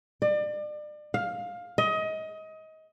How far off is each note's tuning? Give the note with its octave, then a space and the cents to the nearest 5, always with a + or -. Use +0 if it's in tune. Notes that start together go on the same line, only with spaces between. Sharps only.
D5 +35
F5 +15
D#5 +25